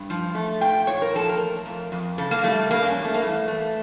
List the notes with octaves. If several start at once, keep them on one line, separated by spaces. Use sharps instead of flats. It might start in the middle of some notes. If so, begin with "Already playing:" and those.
Already playing: G2
F3
A3
A#2 G5
A#2 C#5
A#4
F3 A4
A#4
A3
F2
F2
C#3 A4
A#3
G3 A3
G2 A#3
D4
C#4
G2
A3
A#3
E3 A3
A3